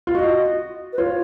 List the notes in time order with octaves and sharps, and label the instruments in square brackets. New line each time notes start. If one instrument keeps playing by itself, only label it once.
[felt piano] F4
[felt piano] F#4 [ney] D#5
[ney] B4
[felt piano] F4 [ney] C#5